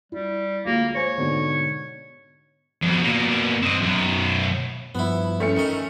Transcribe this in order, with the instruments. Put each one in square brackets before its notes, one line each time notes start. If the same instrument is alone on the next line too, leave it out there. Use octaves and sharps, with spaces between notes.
[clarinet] G3 [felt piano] E4
[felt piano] D2 G#3 F4 [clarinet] A#3
[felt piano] C5 G#5 [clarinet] C#5
[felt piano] G#2 B2 D3
[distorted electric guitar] F2 B2
B2 A#3
C4 D#5
F#2 B2
[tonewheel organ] G2 F3 [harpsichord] B3 E4
[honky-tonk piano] A3 C#4 C#7
[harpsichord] D#3 D#5